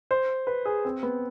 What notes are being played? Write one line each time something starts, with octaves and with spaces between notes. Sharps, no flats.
C5
B4
G#4
C4
B3